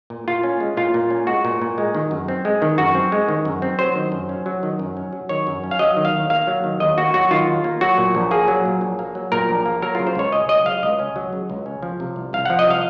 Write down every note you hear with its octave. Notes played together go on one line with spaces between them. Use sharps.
A#2
A#2 F4
C#4
G#3
A#2 F4
A#2
C#4
G#3 F#4
A#2
A#2
G#3
D#3
F#2
C4
G#3
D#3
F#2 F#4
C4
G#3
D#3
F#2
C4
F#3 C5
D#3
F#2
C#4
F#3
D#3
F#2
C#4
F#3
D#3 C#5
F#2
C#4
F5
F#3 D#5
D#3
F5
D#2
A#3 F5
F#3
D#3
D#2 D#5
A#3 F#4
F#3 F#4
D#3 F4
D#2
A#3
F#3 F#4
A#2
A#1
A#3 G#4
F#3
A#2
A#1
A#3
F#3
A#2 A#4
A#1
A#3
F#3 A#4
C#3 F4
C5
C#2 C#5
C#4 D#5
F#3 D#5
C#3 F5
C#2 D#5
C#4
F#3
C#3
C#2
C#4
F3
C3
C2
C2 F5
F3 F#5
D#5
C3 F5